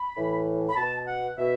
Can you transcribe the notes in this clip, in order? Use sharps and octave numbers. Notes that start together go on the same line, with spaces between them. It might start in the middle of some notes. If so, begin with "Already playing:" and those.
Already playing: B5
A2 E3
B5
B2 A5
F#5
B2 E5